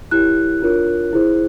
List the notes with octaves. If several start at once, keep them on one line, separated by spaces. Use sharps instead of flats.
E4 G4 A#4 C#5 F#6
D4 F4 A#4 C#5
E4 G#4 C5